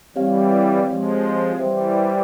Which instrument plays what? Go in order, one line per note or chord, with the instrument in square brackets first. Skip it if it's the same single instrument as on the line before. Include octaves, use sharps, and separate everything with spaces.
[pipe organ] E3 G3 [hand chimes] C4 G4 C#5 F5
[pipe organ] F3 G#3
[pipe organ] E3 G3 [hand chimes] G4 C5 E5 G5